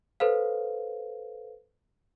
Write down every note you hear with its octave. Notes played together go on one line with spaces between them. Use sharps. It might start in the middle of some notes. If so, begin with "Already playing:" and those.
A4 B4 C5 F5